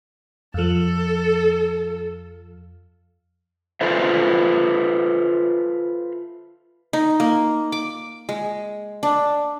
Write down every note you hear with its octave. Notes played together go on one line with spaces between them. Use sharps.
F2 F3 A4
F4 A4 B4 C5 E5
D#4
A#3
D6
G#3
D4